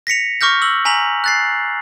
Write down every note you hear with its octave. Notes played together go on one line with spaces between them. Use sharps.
A#6 B6 C#7 F7
C#6 D6 F6 G6 A#6
E6 F#7
G#5 A#5 B6 F7 F#7
F#6 A6 C7